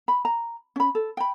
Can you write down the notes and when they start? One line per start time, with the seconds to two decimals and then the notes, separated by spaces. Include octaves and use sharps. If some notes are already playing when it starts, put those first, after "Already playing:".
0.08 B5
0.25 A#5
0.76 C#4 B5
0.95 A4
1.17 G5 B5